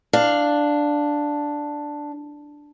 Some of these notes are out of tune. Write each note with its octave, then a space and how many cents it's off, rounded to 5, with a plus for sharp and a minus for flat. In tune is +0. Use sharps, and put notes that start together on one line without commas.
D4 +0 F5 +0